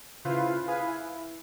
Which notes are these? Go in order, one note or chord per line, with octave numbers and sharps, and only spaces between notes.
C#3 E4 F4 B4 C5 F5
G#4 B4 F5 G#5
E4